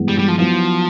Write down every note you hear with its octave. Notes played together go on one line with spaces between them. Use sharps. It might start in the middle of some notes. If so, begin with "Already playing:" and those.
Already playing: G2 E3 G#3 B3
G3
G3
F3
F3 F#3 B3 E4